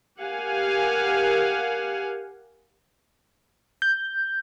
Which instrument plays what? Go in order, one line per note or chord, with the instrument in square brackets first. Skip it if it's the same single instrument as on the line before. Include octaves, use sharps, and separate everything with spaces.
[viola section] G4 A#4 F5 F#5 G#5
[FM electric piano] G6